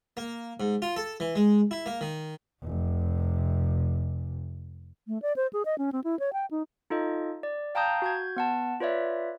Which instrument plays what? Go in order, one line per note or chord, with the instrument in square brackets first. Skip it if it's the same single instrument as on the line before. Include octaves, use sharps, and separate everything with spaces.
[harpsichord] A#3
G#2
F4
A4
E3
G#3
E4
A#3
D#3
[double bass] F1 C3
[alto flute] A3
D5
C5
G#4
D#5
C#4
C4
E4
C#5
G5
D#4
[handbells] D#4 F4 A4 D#5
D5
F5 G5 A5 A#5 D#6 G6
F#4 G6 G#6
B3 F#5 A5
F4 B4 C#5 D5 E5